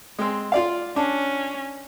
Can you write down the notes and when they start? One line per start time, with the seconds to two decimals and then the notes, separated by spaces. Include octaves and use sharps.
0.19 G#3 C4
0.52 F4 D5 F5
0.96 C#4 D4